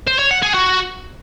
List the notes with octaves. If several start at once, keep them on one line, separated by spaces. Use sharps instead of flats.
C5
C#5
F#5
G#4
F#4